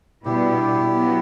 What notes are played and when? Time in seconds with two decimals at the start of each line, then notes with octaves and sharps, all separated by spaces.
0.25 B2 G3 B3 D4 E4 G4
0.90 F#3 B3